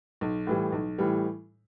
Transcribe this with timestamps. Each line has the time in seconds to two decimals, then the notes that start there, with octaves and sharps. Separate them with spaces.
0.21 B1
0.47 A2 E3 G3
0.72 B1
0.98 A2 E3 G3